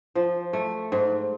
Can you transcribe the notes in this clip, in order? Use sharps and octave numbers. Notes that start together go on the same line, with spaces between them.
F3
A3
G#2